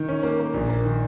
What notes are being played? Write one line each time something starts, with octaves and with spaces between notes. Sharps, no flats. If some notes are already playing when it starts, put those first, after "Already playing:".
Already playing: D#3
C#4
A#3
A#3
A#1
A#3
D#3